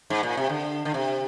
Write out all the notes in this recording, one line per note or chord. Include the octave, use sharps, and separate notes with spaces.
G#2
A#2
C3
D3
D3
C3